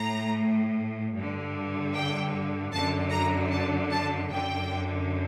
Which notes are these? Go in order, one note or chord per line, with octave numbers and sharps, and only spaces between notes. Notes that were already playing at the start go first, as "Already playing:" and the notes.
Already playing: A2 A#5
G2 D3
G5
F#2 D3 A5
A#5
A5
A5
F#2 D3 G5